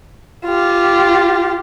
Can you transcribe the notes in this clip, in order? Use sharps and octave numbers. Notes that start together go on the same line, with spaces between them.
F4 G4